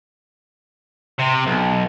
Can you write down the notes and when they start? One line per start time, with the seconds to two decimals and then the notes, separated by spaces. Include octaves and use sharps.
1.19 C3
1.47 B1